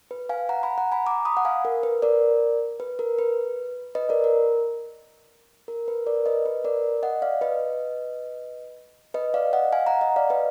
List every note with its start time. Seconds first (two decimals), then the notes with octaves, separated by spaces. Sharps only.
0.11 B4
0.29 F5 G#5
0.49 F#5 A#5
0.63 G#5 B5
0.78 F#5 A#5
0.92 G#5 B5
1.06 A#5 D6
1.25 B5 D#6
1.37 F#5
1.45 F5 G#5
1.65 A#4
1.83 B4
2.02 A#4 D5
2.80 B4
2.99 A#4
3.19 B4
3.95 B4 D#5
4.09 A#4 D5
4.24 A#4
5.68 A#4
5.88 B4
6.06 A#4 D5
6.26 B4 D#5
6.46 B4
6.64 A#4 D5
7.03 D#5 F#5
7.22 D5 F5
7.41 B4 D#5
9.14 B4 D#5
9.34 D5 F5
9.53 D#5 F#5
9.72 F5 G#5
9.86 F#5 A#5
10.01 D#5 F#5
10.16 D5 F5
10.30 B4 D#5